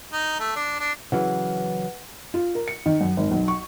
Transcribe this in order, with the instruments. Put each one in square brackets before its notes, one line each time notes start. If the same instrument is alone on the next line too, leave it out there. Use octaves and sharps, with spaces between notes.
[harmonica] D#4
A3
D4
D4
[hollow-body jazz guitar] C#3 E3 F#3 [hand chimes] B4 F#5
[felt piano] F4
A#4
C#7
D#3
F#2
G#1
B1
C#6